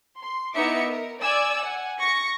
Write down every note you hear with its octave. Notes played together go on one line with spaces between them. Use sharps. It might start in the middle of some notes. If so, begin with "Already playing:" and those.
C6
B3 D#4 E4 E5 D6 C#7
A#4
D5 G#5 E6
F#5 G#5
C#6 A#6 C#7